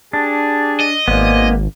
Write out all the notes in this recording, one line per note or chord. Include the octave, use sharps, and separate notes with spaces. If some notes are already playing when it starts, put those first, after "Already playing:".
D4 G4 G#4 A5
D#5
G#1 A#3 B3 C5 D5 G#5